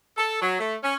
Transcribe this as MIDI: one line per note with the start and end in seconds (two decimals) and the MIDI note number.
0.18 0.39 69
0.41 0.55 54
0.59 0.75 57
0.83 0.95 61